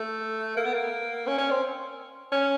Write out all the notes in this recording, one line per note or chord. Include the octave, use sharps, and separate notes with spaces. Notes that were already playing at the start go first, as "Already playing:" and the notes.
Already playing: A3
A#3
B3
A#3
C#4
C#4
C4
C#4